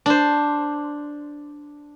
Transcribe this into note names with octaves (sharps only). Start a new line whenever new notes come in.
D4 C5